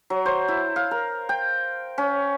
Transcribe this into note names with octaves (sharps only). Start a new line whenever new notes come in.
F#3
C5
E4
F5
A#4
G5
C#4